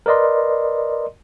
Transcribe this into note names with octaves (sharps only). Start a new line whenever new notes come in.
A#4 B4 D5 D#5 C6